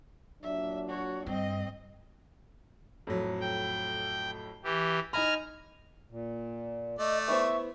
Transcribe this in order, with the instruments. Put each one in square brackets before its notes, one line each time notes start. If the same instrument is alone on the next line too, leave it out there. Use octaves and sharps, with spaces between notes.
[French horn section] A#2 F#3 D4 [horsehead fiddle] E5
[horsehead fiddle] F#4 C#5
[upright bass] G2 [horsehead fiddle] C4 D#5
[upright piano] F2 A2 F#3
[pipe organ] G5
E3 G4
[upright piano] D#4 D#5 B5 [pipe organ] G#5 A#5 F6
[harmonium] A#2
[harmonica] A3 D5 [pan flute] D#5
[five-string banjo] B3 E4 C5 [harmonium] E5 [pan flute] C#6